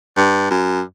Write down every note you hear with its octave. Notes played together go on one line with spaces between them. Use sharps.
G2
F#2